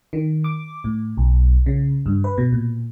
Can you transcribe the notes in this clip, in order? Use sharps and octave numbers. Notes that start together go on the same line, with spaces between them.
D#3
D6
A2
B1
C#3
G2
B4
B2
A#2